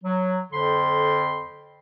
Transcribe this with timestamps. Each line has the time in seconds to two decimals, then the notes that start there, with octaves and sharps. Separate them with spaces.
0.03 F#3
0.53 F2 D3 C5 B5 C6